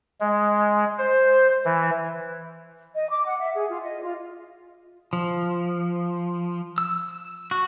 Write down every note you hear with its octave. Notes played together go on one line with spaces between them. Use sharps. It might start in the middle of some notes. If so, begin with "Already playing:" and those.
G#3
C5
E3
D#5
D6
F#5
E5
G#4
F4
D#5
F4
F3
E6
F#4